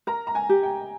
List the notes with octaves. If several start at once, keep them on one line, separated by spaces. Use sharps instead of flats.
A#4 A#5
A#5
G#5
G4
G5